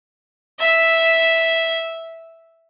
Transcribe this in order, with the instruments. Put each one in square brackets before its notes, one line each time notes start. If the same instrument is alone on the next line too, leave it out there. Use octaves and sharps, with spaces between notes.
[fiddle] E5